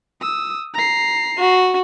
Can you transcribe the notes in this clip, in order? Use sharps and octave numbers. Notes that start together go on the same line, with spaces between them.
D#6 E6
A#5 C7
F#4